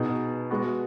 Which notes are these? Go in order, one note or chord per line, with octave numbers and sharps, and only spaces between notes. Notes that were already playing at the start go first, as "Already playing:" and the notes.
Already playing: B2 B3 D#4 G#4
G#3 B3 F#4